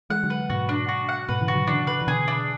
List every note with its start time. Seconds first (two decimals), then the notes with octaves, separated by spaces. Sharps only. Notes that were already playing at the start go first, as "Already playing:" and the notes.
0.10 E3 G#3 F#5
0.23 D3 F#3
0.30 B4
0.50 G#2 B2 F#4
0.69 D4
0.89 F#4
1.09 F#5
1.29 G#2 B2 B4
1.41 C#3 E3
1.48 F#4
1.55 D3 F#3
1.67 C#3 E3 D4
1.87 B4
2.02 E3
2.07 B2 D3 G#4
2.28 D4